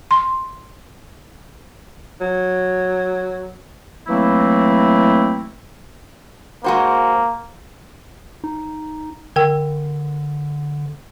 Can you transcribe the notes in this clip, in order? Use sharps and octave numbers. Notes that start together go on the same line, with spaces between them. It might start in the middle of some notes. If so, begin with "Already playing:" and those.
C6
F#3
E3 F#3 A3 A#3 C4 E4
G#3 A#3 F#4 C5
D#4
D3 A#4 G5 E6